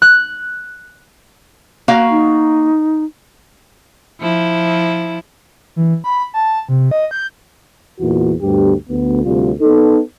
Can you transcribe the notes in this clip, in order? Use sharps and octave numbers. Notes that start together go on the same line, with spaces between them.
F#6
A#3 F#4 F5
D#4
F3 E4
E3
B5
A5
C3
D#5
G6
E2 A#2 E3 F#4
D2 G2 B2 G4
D2 B3
D2 C3 G3 F4
B3 D#4 A4